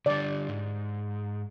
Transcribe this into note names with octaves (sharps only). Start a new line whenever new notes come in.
D3 G3 D5
G#2